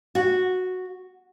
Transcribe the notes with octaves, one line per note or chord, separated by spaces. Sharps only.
F#4